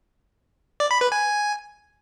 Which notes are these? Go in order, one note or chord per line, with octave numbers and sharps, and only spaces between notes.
D5
B5
B4
G#5